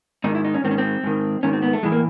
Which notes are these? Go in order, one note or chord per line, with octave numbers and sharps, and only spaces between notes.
G#2 D#3 D#4
E4
D#4
C#4
G#2 D#3 C4
C#4
C4
G#2 D#3
G#2 D#3 C#4
C4
B3
A3
A2 E3 G#3
A#3